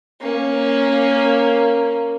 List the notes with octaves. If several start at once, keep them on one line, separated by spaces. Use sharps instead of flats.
A#3 C#4